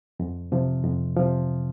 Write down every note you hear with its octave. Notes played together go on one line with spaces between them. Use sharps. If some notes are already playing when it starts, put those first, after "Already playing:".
F2
C3 F3
F2
C3 F3